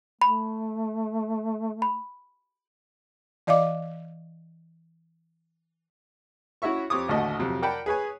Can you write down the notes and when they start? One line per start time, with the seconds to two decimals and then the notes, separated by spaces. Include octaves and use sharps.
0.22 A3 B5
1.82 B5
3.47 E3 D5 D#5 F5 D6
6.62 C#4 E4 F#4 C#5 E5 C#6
6.90 F2 C4 G4 C#5 D6 D#6
7.08 A1 D#2 D3 A3 F#4 D#5
7.40 F2 C3 F#3
7.62 A#4 D5 F#5 G5 A5 B5
7.86 G#4 B4 C#5 G#5